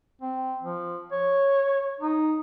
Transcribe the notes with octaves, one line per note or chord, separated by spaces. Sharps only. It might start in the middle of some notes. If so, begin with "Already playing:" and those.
C4
F3
C#5
D#4